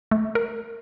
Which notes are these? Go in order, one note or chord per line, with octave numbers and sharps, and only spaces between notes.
A3
A#4